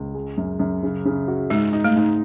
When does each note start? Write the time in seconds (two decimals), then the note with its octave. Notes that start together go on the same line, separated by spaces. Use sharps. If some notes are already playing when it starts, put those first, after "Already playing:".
Already playing: C#2
0.14 G#3
0.37 F#2
0.60 F#2
0.83 C#3
1.05 C#3
1.28 F#4
1.50 G#2 G#3
1.73 D#4
1.84 A3
1.96 G#2